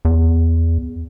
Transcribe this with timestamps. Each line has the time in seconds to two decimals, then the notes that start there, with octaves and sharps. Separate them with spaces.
0.05 E2